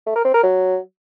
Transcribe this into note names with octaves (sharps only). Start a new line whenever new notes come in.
A3
A#4
C4
A#4
F#3